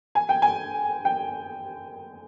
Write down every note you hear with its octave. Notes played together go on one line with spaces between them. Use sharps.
G#5
G5
G#5
G5